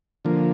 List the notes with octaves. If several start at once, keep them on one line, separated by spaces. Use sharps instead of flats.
D3 F3 A#3